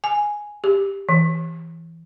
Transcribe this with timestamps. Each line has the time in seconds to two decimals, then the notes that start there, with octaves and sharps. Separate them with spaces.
0.04 G#5
0.64 G4
1.09 E3